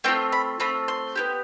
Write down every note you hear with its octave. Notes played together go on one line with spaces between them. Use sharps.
A3 C4 F4 G5
B5
A3 C4 F4 B5
C6
B3 E4 G4